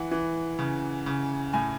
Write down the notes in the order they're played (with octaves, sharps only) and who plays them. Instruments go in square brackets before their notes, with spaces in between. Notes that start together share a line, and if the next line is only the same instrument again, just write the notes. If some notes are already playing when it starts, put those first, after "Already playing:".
Already playing: [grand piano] E3 F#5
E3
C#3
C#3
A2 G#5